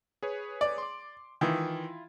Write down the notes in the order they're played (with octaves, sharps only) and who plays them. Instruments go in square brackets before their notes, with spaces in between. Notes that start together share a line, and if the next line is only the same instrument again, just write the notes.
[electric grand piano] G#4 B4 C#5
[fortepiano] D5
[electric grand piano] C6 D6
[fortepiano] D#3 E3 [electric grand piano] E4 F4